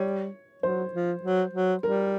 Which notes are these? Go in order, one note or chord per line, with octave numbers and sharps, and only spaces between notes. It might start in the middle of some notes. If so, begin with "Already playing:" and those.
Already playing: G3 C#5
F#3 C5
F3
F#3
F#3
G3 A#4